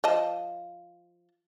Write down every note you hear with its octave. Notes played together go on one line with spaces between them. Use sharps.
F3 D#5 A5